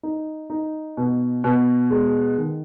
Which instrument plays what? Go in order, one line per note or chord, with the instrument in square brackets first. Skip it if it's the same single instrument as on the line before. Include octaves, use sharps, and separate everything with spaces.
[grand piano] D#4
D#4
B2
B2
G#3
D#3